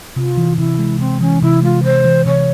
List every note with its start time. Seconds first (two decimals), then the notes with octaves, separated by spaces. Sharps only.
0.16 C3 F4
0.37 E3
0.58 C3 E4
0.79 G#3
0.99 C3 C4
1.21 E3 C#4
1.42 C3 E4
1.62 G#3 F4
1.84 C3 C5
2.05 E3
2.26 C3 C#5